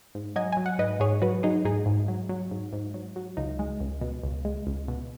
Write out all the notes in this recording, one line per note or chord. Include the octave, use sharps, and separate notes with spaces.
G#2
F#3 D#5 G#5
F#3 G#5
F#5
G#2 B4 D#5
G#2 G#4 C#5
F#3 F#4 B4
F#3 D#4 G#4
G#2 D#4 G#4
G#2
F#3
F#3
G#2
G#2
F#3
F#3
C#2 D#4
G#3
C#2
B2
C#2
G#3
C#2
B2